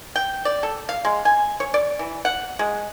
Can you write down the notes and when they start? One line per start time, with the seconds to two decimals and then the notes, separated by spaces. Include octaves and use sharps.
0.16 G5
0.45 D5
0.63 A4
0.89 F5
1.05 G#3
1.25 G#5
1.60 C#5
1.74 D5
1.99 E3
2.25 F#5
2.59 G#3